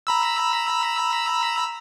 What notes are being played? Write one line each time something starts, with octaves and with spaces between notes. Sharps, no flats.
A#5 B5 E6